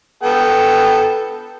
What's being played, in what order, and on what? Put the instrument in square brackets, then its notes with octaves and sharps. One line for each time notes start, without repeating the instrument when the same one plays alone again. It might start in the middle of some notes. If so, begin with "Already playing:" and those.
[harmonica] B3 A4 G5